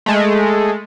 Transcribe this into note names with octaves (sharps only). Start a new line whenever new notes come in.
G#3 A3